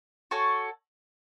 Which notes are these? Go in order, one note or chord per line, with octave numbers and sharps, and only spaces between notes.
F#4 A4 C#5 G#5